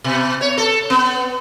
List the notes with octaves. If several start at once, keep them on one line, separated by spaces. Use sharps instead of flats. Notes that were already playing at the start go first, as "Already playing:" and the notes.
B2
C#5
A4
B3